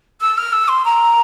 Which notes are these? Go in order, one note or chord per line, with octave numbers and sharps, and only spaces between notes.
E6
F6
E6
C6
A#5